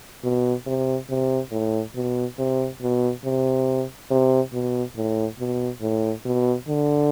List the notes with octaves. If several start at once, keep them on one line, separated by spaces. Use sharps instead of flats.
B2
C3
C3
A2
B2
C3
B2
C3
C3
B2
A2
B2
A2
B2
D3